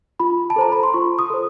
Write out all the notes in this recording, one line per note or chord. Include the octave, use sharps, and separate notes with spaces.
F4 B5
A5
A4 C5 A#5
B5
C6
F4 C#6
D#6
A4 C5